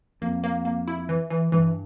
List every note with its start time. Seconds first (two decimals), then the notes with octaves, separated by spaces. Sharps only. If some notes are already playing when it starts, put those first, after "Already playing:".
0.22 F2 A#3
0.44 A#3
0.65 A#3
0.88 E4
1.09 E3
1.30 E3
1.52 G2 E3